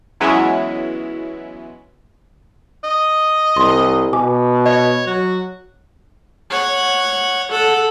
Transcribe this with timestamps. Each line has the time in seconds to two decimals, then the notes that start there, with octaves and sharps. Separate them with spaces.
0.20 E3 F#3 G#3 B3 C#4 E4
2.84 D#5
3.57 C2 C6
4.13 B2 G#5 D6
4.66 C#5 D#5
5.07 F#3 F#4
6.50 C#5 F#5
7.51 A4 F#5